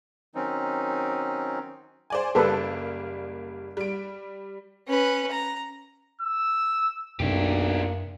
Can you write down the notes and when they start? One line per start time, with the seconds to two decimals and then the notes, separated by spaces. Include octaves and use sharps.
0.35 D#3 F#3 C4 C#4 D#4
2.10 C5 D5 G#5
2.35 F#1 G3 A#3 A4 B4
3.77 G3 D7
4.88 C#4 B4
5.31 A#5
6.21 E6
7.20 B1 F#2 C3 A#3 C4 D4 E4 G4